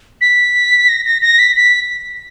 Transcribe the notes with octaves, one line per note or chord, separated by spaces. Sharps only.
B6
A#6
A#6
A#6
B6
B6